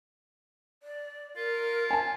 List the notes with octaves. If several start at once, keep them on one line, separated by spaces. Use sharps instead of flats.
D5
F4 A#4
G#5 A5